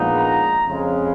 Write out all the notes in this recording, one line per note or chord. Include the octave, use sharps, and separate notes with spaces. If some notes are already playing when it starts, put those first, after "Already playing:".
Already playing: A#1 A#2 G#3 B3 D#4
A#5
F2 C#3 G#3